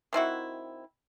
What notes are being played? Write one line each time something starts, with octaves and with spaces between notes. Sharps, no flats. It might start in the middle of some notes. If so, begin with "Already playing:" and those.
D#3 C4 E4 F#4